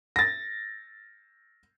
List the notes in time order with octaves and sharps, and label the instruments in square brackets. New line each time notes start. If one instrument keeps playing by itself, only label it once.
[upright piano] A6 A#6